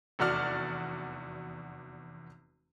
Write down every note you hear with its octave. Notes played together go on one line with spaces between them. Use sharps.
F1 E2 F#4 D5 F6